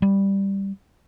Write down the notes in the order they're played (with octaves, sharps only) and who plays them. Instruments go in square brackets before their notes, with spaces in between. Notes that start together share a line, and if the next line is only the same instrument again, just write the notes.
[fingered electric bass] G3